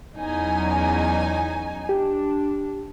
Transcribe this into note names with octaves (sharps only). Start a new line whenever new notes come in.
E2 F#3 C#4 D#4 G#5
D4 G4